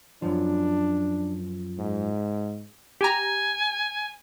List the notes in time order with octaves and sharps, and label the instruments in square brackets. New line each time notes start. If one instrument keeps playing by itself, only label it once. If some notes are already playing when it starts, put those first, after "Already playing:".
[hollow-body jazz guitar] F#2 F3 [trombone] D4
[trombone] G#2
[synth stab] G4 A#5 [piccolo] G#5